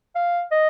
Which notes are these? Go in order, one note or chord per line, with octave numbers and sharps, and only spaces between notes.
F5
D#5